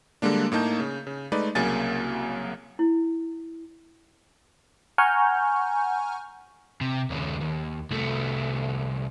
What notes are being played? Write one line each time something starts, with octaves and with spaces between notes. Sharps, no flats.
D3 G3 G#3 A#3 D4
A2 A#3 D#4 A5 G6
C#3
C#3
G#3 A3 D#4 B4 D5
C2 C#3 F#3 A#3 G#5 A6
E4
F#5 G#5 A#5 C#6 F6 G6
C3
D#2 C#3
D#2
C2 A3